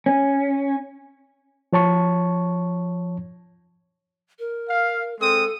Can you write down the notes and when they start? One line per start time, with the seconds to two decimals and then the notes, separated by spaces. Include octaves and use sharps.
0.06 C#4
1.73 F3 C#5 A5 C#6
4.39 A#4
4.69 F5
5.20 G#3 C4 A4 D#6